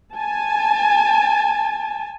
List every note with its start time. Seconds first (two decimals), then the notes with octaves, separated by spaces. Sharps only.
0.14 G#5 A5